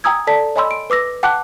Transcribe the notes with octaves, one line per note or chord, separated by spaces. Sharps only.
G5 G#5 A#5 D#6 E6 G#6
A4 D5 A5 B6
C#5 D#5 G#5 B5 C6 E6
D7
B4 D6 E6 A#6
F#5 G5 A5 D6 F#6